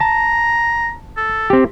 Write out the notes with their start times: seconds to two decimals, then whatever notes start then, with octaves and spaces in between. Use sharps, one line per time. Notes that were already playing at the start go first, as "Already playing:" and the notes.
0.01 A5 A#5
1.17 A4
1.50 C4 G4